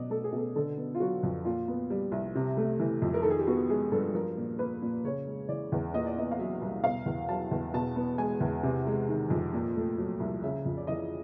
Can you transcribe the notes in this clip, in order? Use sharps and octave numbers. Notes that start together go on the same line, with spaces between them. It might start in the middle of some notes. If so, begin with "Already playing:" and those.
Already playing: B2 F#3 D5 D#5
A3 A4
G#4
B2
A4
D3 A4
B3
F4
F#3 F#4
F2
A#2 F4
B3
G3
C2
C3
A3
E3
F2
A#4
D#3 A4
G#4
G4
B3 F#4
G#3 G#4
G2 A4
F3 A#4
A#2
A#3 B4
A#2
C#3 C#5
G#3
E3 D5
E2
A#2 D#5
D5
B3 D#5
F5
F#3 E5
C2
B2 F5
E2
F#3 A5
E2
B2 A5
B3
G#3 G#5
E2
C3
G#3
D#3
F2
A#2
A3
F#3
C2
C#3 E5
F2
D5
E3 D#5